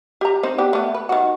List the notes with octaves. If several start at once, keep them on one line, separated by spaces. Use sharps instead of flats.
G4 A#5
C4 D#4 C5
B3 D4 G4
A3 B3
B4
D#3 F#4